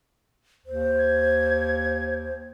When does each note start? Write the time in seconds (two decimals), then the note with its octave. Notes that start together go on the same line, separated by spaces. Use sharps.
0.66 D#2 C5
0.98 G#6